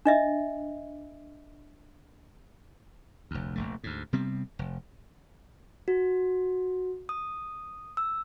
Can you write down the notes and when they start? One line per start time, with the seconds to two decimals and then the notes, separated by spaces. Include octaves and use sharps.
0.05 D4 D#5 E5
3.31 F1 D2
3.56 F1 A#1 A3
3.84 D2 G#2
4.13 C3 G3 B3 C4
4.59 F1
5.88 F#4
7.09 D#6
7.97 E6